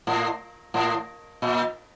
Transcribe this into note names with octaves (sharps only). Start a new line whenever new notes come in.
A2
A2
A#2